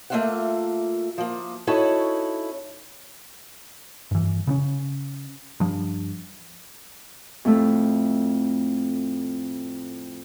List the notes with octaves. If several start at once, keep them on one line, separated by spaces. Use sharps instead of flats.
A3 A#3 E4 F4 E5 F#5
F3 A#3
C#4 D#4 E4 F#4 A4 C#5
G2 E3
C#3 B3 C#4
G2 F3
F2 A2 A3